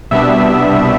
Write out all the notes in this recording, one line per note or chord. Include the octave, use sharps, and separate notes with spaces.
C2 B2 G3 B3 D4 E5